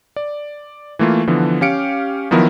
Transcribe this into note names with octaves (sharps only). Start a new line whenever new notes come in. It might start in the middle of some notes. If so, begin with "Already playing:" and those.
D5
E3 A3 A#3 F4
D3 E3 F3 B3
C#4 G4 F5 C#7 D7
D#3 F3 F#3 B3 E4 A#4